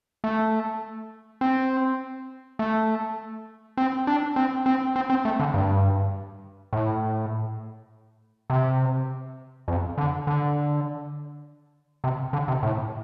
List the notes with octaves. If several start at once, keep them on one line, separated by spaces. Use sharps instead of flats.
A3
C4
A3
C4
D4
C4
C4
C4
C4
A3
D3
G2
A2
C3
F2
D3
D3
C3
D3
C3
A2